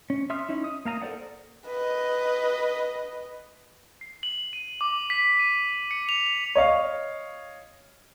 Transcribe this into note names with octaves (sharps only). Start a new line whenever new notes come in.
C#4
E5 C6 D#6 F6
C#4 D#4 E4
D#6
A#3 F5 A#5 D#6
A4 A#4 C5 D5 F#5
B4 D#5
C7
F#7
D#7
D6
B6
D#7
C#7
F7
F7
C#5 D#5 F5